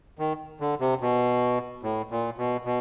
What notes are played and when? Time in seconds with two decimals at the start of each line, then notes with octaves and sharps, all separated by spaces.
0.19 D#3
0.60 D3
0.80 C3
1.01 B2
1.83 A2
2.11 A#2
2.38 B2
2.65 B2